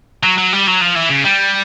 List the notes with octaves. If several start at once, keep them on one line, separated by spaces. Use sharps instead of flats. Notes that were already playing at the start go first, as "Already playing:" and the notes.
F#3
F#3
G3
F#3
F3
E3
C#3
G3